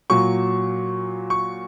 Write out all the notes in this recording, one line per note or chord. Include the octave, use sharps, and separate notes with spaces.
A#2 F#3 C#6
C#6